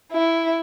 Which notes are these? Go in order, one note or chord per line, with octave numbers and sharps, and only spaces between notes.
E4